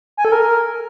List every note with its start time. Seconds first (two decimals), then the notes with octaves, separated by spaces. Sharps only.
0.17 G#5
0.25 A4
0.32 A#4